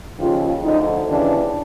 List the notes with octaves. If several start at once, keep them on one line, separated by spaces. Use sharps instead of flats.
D#2 C#3 F3 F4
D2 D3 F3 D#4
D#2 C#3 E3 D4